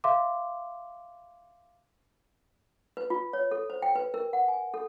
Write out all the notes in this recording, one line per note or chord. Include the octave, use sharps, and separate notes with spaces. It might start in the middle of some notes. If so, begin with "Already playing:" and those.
E5 F5 C6 D6
B4
F4
C#5
A4
C5
G5
B4
A#4
F#5
G#5
A4